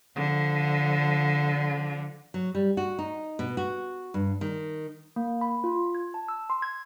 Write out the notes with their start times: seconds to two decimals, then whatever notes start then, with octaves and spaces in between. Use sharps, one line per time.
0.16 D3 F3
2.34 F#3
2.55 G3
2.77 F#4
2.99 D#4
3.39 B2
3.57 F#4
4.14 G2
4.41 D#3
5.16 A#3
5.41 B5
5.64 F4
5.95 G#6
6.14 A5
6.28 E6
6.50 C6
6.62 G#6